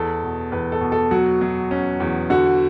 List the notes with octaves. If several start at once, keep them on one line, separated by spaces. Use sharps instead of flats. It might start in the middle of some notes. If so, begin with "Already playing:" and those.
Already playing: E2 A4
B2
E2 B4
A4
B2
A4
F#3 F#4
F#3
C#4
E2
D3 F#4